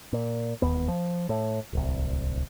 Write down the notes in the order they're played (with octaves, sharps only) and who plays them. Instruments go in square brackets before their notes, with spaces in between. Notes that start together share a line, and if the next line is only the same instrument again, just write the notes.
[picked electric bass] A#2
E1 D#2 B3
F3
A2
D1 C2